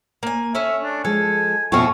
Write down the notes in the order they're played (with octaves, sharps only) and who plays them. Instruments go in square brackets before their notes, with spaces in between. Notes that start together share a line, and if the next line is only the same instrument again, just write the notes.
[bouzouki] A#3 G#5
[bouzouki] A3 C#4 [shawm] E5
[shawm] D4
[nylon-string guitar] F3 G#3 [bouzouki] A4 [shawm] G#5
[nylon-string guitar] F2 B2 F4 [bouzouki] A3 C#4 [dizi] C#6